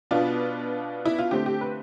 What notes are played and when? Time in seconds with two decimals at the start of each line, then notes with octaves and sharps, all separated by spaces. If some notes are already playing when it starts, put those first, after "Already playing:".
0.11 B2 B3 D4 F4
1.05 E4
1.19 F4
1.31 D3 A3 C4 G4
1.46 G4
1.61 B4